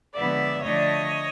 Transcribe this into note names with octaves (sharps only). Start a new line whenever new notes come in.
D3 F3 G#3 B3 D5 E5
D3 F3 A3 D4 C#5 D#5